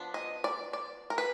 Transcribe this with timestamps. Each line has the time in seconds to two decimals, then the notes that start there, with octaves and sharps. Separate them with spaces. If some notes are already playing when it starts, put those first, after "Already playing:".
Already playing: F3 B3 D4
0.14 D#5
0.44 D5
0.73 D5
1.10 A#4
1.18 B4